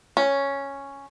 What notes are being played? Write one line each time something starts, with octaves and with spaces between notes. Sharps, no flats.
C#4